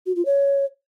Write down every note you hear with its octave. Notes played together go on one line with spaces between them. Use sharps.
F#4
F4
C#5